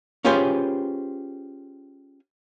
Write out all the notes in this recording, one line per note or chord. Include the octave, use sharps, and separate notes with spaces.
C#4 F4 G4 G#4 B4 C5